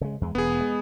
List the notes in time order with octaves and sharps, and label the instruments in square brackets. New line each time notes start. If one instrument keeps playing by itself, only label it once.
[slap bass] C#3 G#3
E2 G#3
[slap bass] E1 [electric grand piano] B3 G#4
[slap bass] G#3